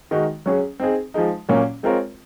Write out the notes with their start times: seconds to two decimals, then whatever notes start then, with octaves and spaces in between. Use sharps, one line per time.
0.11 D#3 G#3 D#4 F#4
0.46 F#3 C#4 G#4
0.80 C4 D#4 G#4
1.14 F3 G#3 D#4
1.49 A#2 F#3 A#3 C#4
1.83 G#3 C4 F4 A#4 C#5